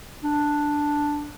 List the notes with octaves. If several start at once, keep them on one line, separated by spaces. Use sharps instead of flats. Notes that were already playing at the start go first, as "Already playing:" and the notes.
D4